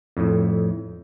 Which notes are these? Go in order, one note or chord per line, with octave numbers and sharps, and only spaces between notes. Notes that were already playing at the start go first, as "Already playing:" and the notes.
F2 A2